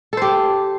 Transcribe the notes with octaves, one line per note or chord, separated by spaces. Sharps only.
G4 A4 C5